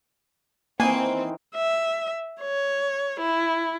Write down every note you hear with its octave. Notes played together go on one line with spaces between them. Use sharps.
D#3 E3 A#3 C4 D#4 G#5 C7
E5
C#5
E4